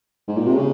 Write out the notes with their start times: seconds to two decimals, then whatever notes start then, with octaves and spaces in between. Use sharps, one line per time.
0.28 G#2
0.37 A#2
0.47 C3
0.56 C#3